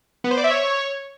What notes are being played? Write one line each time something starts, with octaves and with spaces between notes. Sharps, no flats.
B3
C5
D5
E5
C#5